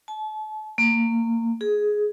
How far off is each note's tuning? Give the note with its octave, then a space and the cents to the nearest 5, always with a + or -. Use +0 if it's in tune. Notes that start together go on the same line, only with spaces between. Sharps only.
A5 -35
A#3 -25
G#4 +10